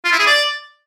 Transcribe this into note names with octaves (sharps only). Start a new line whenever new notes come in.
F4
E4
G#4
D5